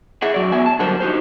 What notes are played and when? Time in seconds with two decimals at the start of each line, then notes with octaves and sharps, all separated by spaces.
0.22 G#4 E5 F#5
0.34 F#2 F#3 D5
0.52 B3 F#4 E5 G#5
0.66 A5
0.79 D3 F#3 G3 F#4 A#4 C5
1.00 D#4 F#4 G4 C5